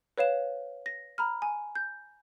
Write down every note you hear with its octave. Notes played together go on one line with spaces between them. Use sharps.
B4 C#5 F5 E7
A#6
A#5 B5 F6
G#5
G6